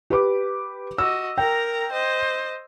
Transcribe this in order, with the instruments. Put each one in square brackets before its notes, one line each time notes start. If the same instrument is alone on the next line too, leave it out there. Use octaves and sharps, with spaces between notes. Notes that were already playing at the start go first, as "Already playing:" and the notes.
[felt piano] G4 B4 D6
[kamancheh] F#4 D#5 [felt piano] E6
[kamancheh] A#4 A#5 [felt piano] G5
[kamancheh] C5 D#5